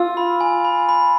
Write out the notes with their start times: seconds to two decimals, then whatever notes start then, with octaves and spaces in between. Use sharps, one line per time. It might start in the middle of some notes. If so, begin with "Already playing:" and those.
Already playing: F4 E6
0.17 B5
0.41 G#5
0.64 B5
0.89 B5